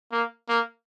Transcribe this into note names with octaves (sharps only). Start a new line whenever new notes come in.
A#3
A#3